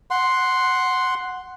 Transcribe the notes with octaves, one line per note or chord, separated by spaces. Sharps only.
F#5 C6